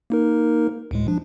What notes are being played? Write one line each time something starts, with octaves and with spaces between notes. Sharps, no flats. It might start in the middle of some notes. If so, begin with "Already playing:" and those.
A#3 D#4 A#4
D2 A2 G#3
F3 D4